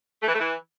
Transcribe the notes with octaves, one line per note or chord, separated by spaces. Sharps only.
A3
E3
A3
E3